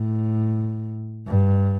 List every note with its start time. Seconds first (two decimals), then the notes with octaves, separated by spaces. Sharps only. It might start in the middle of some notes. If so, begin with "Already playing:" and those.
Already playing: A2
1.28 G2